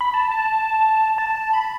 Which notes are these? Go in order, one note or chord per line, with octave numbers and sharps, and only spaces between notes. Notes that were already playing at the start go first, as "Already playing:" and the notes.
B5
A5
A5
A5
B5